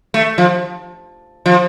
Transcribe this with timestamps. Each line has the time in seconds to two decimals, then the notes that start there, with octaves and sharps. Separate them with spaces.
0.14 A3
0.38 F3
1.46 F3